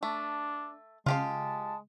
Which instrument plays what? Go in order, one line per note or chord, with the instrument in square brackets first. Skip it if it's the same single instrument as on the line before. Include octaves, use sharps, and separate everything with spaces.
[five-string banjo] A3 [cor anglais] D4
[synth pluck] C#3 [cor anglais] G#3 [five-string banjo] F4 G4 F5 [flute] A5